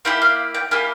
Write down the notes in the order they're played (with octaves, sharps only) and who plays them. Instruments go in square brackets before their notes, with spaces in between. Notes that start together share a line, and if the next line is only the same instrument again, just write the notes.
[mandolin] A#3 E4 G4 G5
F5
G5
A#3 E4 G4 G#5